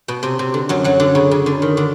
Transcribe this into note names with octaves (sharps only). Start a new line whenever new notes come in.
B2
C3
C3
D3
F#2 F#3
F#2 F#3
D3
C#3
C#3
D3
D#3
D3